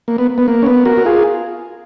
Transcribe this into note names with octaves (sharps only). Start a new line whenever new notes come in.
A#3
B3
B3
A#3
C#4
B3
F#4 A#4
F#4
F4 G#4